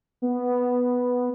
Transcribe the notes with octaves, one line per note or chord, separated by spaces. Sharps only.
B3